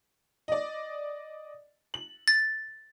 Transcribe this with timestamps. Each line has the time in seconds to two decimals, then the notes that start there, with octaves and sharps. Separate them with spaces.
0.48 D5 D#5
1.94 F#7
2.28 A6